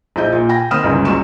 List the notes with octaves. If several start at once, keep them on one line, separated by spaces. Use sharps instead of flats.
A#1 E4 D#5 G6
A#2
G5 G#5 B5 A#6
D#3 C4 B5 D#6 F6 E7
G1 C#2 G#2 C#3 E3
C#2 F#3 C#6 E7